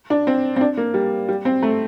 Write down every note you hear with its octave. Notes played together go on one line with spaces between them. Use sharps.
D4
C4
C4
D4
A#3
G3
G3
C4
A3